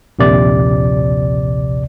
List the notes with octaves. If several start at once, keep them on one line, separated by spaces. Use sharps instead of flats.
A#1 D#2 C3 D5